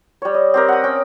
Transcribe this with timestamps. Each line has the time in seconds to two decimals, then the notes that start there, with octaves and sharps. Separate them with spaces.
0.22 G3 C#5
0.34 D#5
0.54 C4 G4 A#4
0.68 F#5 D#6
0.84 C#4 G5